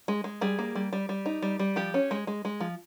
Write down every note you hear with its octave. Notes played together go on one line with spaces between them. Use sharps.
G#3
G#3
G3 G#4
A#3
G3
G3
G3
D#4
G3
G3
F3 G4
C#4
G#3
G#3
G#3
F3